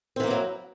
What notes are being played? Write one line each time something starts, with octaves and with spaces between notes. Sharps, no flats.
E3 F#3 A#3 C4 E4